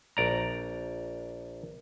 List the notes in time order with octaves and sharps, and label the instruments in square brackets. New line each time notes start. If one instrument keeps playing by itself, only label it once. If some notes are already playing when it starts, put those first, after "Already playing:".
[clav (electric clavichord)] A#1 D5 A#5